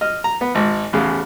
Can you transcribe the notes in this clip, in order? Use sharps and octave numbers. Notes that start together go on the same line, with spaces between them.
D#5 F6
A#5
B3
G#1 G#2
A1 E2 C#3 F5